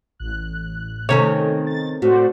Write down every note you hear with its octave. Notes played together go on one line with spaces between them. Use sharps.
A1 F#6
C3 D#3 A3 C#4 C#5
A6
A2 F#4 C5 D5